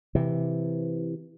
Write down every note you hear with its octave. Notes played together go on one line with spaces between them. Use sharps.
C3 E3